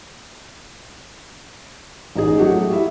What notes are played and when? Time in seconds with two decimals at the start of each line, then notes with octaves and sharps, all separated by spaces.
2.16 A1 D#4 G#4
2.38 F#3 A3 F#4 G4
2.71 E4 E5